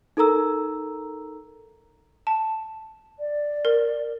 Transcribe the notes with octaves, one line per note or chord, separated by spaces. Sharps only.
D#4 A4 A#4 A#5 E6
A5
D5
A#4